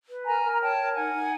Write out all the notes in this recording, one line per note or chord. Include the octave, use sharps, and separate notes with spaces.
B4
A#4 G#5 A#5
A#4
A#5
C#5 G5 A5
A#4
D#4 F#5 G#5
D#4